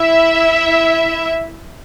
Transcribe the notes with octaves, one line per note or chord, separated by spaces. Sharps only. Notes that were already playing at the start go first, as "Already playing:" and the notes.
Already playing: E4 E5